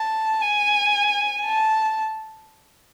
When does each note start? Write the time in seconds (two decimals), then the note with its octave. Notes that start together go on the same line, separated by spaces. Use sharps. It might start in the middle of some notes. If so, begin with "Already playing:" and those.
Already playing: A5
0.42 G#5
1.46 A5